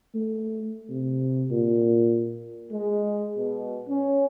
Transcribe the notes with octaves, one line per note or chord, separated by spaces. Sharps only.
A3
C3
A#2
G#3
B2
C#4